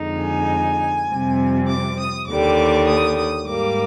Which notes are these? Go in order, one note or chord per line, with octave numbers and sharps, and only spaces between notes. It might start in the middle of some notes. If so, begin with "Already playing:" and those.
Already playing: F2 D3 G#3 D#4
G#5
F2 C3 G3 C4
D6
D#6
D#2 D3 G3 D6
D#6
D#6
G#2 G3 A#3 D6